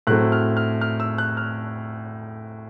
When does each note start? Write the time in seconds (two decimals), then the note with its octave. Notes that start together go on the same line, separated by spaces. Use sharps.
0.07 A2 F#3 A3 C4 F#6
0.32 F6
0.57 F6
0.81 F6
1.00 E6
1.18 F#6
1.37 F6